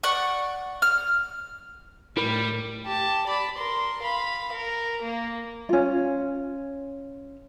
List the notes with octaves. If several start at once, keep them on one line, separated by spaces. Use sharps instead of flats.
D5 F#5 C#6
F6
A2 G3 E4 A#4 B5
G4 A5
D5 B5
A#4 C6
F5 B5
A#4
A#3
C#4 F4